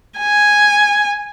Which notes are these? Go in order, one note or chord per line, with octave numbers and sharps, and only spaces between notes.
G#5